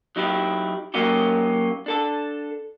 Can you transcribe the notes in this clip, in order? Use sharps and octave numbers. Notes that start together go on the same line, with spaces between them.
F#3 D#4 E4 G4
F#3 A#3 C#4 D#4 F#4 G4
D4 A4 A5